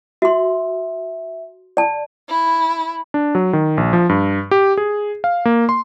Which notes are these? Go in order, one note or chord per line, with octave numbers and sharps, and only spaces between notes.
F#4 E5 C6
D5 A5
E4
D4
F#3
D#3
A#1
F3
G2
G4
G#4
F5
A#3
C6